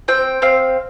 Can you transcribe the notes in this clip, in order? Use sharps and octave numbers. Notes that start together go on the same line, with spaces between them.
C4 G5
C4 F5